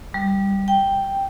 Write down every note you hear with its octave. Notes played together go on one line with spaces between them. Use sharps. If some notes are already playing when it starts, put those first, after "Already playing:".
G3
G5